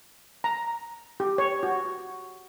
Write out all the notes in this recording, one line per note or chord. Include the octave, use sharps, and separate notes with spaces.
A#5
G4
C#5
F#4